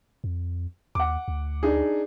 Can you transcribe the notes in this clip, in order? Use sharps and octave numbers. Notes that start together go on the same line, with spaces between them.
F2
D#2 F#5 D6
D2
D4 D#4 G#4